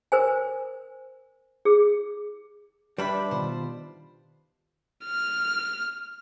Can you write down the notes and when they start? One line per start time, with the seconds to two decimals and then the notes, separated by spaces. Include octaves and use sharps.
0.12 A#4 C5 G#5
1.65 G#4
2.98 G3 D4 B4 E5 B5
3.31 B2 D#3 F4 C5
5.05 F6